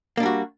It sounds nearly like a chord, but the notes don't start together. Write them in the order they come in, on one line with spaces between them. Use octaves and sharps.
A#3 D4 G3 F#4